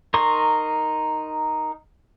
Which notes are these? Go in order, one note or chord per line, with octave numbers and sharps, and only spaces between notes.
D#4 A#4 C6 C#6